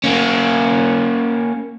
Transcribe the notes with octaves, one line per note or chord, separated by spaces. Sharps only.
A#3 C#4